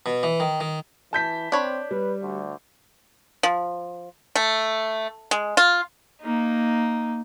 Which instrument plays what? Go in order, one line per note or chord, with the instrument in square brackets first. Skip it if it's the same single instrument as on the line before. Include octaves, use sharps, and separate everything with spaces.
[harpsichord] B2
E3
D#3
D#3
[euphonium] E3 [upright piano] A5 G6 B6
[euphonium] C4 [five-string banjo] D4 C#5 B5
[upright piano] G3 [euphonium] B4
[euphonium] D2
[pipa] F3
A3
G#3
F4
[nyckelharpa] A#3 D#4